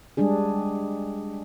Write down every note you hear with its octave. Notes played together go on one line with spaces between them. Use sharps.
G3 G#3 D4 G#4